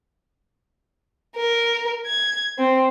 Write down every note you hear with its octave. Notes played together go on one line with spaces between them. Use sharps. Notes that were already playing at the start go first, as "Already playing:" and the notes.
A#4
G#6
C4